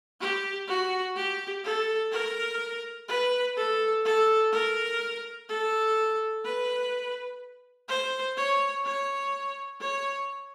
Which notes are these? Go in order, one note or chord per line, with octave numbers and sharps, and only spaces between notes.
G4
F#4
G4
A4
A#4
B4
A4
A4
A#4
A4
B4
C5
C#5
C#5
C#5